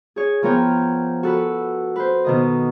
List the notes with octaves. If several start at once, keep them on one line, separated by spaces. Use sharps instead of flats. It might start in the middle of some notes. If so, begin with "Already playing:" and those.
G#4 C#5
F3 B3 A#4 C#5 G5
F#4 A4 B4
B4 C5
B2 D#3 D#5